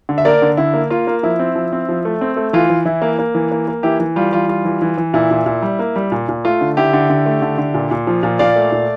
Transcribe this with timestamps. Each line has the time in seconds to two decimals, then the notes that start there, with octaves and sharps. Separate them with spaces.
0.09 D3
0.18 E5
0.25 A#3 A#4 D5
0.42 D3
0.57 D3 E4
0.74 A#3
0.90 A#3 F4
1.07 A#3
1.23 F3 E4
1.39 C4
1.55 F3
1.72 C4
1.89 F3
2.05 A3
2.21 C4
2.36 A3
2.53 E3 F4
2.70 E3
2.85 E3 E4
3.02 A#3
3.19 A#3
3.35 E3
3.51 A#3
3.68 A#3
3.83 E3 E4 G4
3.99 E3
4.16 G3 F4
4.32 E3 F4
4.48 G3 F4
4.65 E3
4.82 E3
4.97 E3
5.14 A#2 E4
5.31 A#2
5.46 A#2
5.62 G3
5.79 A#3
5.96 G3
6.12 A#2
6.29 A#2
6.45 A3 F4
6.61 D3
6.77 D3 E4 G4
6.93 D3
7.10 D3
7.26 A3
7.42 D3
7.58 D3
7.74 A#2
7.91 A#2
8.07 F3
8.23 A#2
8.39 A#2 D5 F5
8.56 A3
8.72 A#2